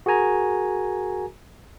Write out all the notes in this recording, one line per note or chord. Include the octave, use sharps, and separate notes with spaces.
F#4 G#4 A#4 G#5 A#5